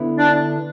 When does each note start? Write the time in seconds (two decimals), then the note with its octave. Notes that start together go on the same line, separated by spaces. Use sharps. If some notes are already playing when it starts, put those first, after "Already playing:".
Already playing: D3 B3 E4 B4
0.18 D4